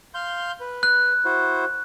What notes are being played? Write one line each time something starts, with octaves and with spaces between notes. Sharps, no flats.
F5 C6 G6
B4
F#6
E4 F#4 C5